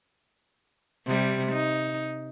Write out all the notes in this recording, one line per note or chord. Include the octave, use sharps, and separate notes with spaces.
C3 G3
D#4